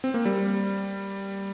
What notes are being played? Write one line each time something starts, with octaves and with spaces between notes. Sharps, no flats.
C4
A#3
G3